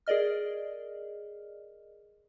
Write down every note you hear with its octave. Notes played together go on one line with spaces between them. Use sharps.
G#4 A#4 D5 D#5 F6